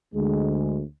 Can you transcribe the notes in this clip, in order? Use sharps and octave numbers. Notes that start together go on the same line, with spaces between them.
D2 G#3